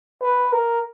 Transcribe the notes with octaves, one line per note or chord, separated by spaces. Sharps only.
B4
A#4